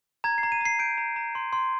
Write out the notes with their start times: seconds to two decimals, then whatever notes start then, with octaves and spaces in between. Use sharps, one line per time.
0.24 A#5 G#6
0.38 C7
0.43 A#5
0.52 D#7
0.61 A#5 C7
0.79 G6 D7
0.98 A#5
1.16 A#5
1.35 C6
1.53 C6